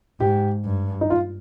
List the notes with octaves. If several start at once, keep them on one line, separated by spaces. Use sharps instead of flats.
G#2 G4
G2
D#4
F4